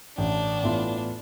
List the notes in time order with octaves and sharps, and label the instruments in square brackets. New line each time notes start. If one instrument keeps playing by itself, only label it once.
[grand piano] A1 [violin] D4
[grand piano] A2 E3 B3 F4